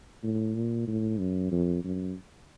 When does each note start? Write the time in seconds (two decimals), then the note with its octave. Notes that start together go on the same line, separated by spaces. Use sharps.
0.23 A2
0.55 A#2
0.88 A2
1.19 F#2
1.51 F2
1.84 F#2